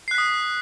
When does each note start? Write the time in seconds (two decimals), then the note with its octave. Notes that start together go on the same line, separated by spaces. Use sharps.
0.08 C7
0.11 F#6
0.15 B6
0.18 D#6